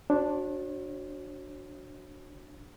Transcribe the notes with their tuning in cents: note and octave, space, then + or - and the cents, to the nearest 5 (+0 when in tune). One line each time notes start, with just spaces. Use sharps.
D4 +0 F#4 +0 C#5 -45